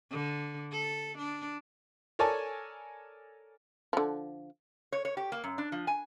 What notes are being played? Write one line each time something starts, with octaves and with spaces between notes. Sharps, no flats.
D3
A4
D4
A4 A#4 C#5 D5 G#5 A5
D3 F3
C#5
C#5
G4
A#3
F#2
D4
F3
G#5